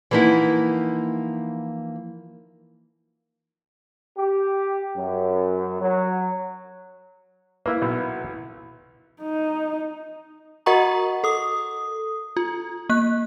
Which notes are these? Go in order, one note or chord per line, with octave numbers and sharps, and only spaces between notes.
E3 F3 A#3 D#4 E4 F#5
G4
F#2
F#3
A#3 E4 B4
B1
D#4
F#4 A#4 D#5 F#5 A#5 C#6
A4 D#6
F4
A#3 F#6